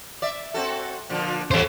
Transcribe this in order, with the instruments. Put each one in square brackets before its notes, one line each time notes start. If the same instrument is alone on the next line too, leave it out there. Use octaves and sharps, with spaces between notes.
[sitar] D5 E5
C4 F#4 A4
A#2 D3 F3
[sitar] C3 F#3 G3 [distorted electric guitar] A4 C5